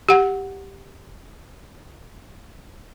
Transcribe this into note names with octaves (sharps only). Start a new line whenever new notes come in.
G4 F#5